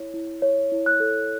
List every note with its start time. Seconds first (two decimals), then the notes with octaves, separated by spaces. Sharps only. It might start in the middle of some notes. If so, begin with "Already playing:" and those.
Already playing: E4 C#5
0.14 E4
0.42 C#5
0.72 E4
0.86 F#6
1.00 A4